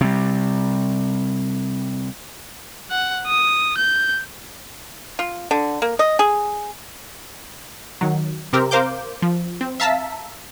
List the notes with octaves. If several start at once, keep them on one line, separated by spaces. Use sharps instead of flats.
C3 G3
F#5
D#6
G6
F4
D3
A#3
D#5
G#4
D#3 F#3
C3 C4 G4 A#4
A#4 C5 F5 D6 G6
F3
C4
E5 F5 A5 A#5 E6 B6